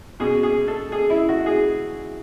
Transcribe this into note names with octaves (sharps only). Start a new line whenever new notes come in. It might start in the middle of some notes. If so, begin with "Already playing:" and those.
B2 G#4
G#4
A4
G#4
E4
F#4
G#4